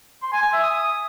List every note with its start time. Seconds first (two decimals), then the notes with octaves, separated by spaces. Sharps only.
0.22 C6
0.33 G#5
0.43 G#5
0.53 E5
0.63 D#6